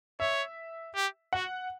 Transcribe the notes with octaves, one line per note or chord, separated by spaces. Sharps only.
C#5 E5
G4
F#4 F#5